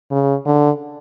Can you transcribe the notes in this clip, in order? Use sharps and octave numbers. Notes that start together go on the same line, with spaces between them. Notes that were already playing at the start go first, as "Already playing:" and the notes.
C#3
D3